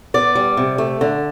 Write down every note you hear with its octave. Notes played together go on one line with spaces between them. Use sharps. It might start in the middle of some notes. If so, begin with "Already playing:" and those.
B3 D5
G3
C3
A3
D3